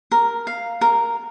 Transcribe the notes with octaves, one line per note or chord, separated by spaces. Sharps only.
A#4
F5
A#4